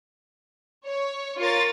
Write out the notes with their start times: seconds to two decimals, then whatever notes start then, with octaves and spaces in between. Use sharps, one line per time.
0.86 C#5
1.38 F4 A#4 C#5 A6